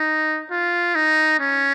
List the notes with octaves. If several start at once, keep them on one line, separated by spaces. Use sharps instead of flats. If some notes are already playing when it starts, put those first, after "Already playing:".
Already playing: D#4
F4
D#4
C#4